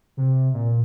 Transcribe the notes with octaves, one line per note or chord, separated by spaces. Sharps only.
C3
A#2